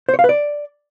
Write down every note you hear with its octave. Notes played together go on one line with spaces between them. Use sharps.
C5
C#5
F5
B4
D5